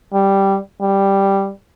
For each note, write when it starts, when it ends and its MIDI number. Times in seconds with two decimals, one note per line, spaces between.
0.13 0.57 55
0.81 1.50 55